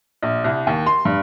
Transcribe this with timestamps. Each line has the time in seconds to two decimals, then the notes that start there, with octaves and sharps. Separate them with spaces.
0.23 A#1
0.44 C2
0.67 D#2
0.86 C6
1.05 G2